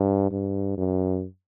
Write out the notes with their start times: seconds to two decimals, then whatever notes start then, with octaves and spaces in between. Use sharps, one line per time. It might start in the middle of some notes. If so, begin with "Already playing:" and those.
Already playing: G2
0.32 G2
0.78 F#2